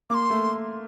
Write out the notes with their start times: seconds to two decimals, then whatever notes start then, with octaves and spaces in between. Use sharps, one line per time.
0.10 A#3 D6
0.14 C6
0.30 A3